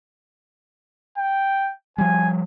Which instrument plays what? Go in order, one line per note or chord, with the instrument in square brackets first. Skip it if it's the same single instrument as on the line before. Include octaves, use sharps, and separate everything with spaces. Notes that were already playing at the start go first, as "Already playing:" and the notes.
[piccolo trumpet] G5
[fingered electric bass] F3 G3 [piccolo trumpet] G#5